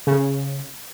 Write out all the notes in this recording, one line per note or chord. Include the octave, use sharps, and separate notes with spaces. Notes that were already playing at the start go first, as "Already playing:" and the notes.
C#3